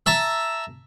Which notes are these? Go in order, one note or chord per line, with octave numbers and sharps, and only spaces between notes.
E5 A5 A#5